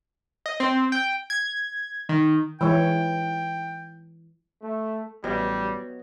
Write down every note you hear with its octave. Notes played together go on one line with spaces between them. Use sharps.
D#5
C4
G5
G#6
D#3
E3 G#3 C#5 G5
A3
A1 F#3 G3 B3 D#5